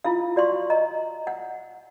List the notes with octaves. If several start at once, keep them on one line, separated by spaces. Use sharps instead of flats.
E4 F4 F5
F#4 D5 F5 C6 C#6
D#5 A#5
F#5